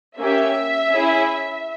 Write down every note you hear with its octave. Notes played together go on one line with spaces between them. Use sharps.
A#3 C#4 G4 E5
C#4 E4 G#4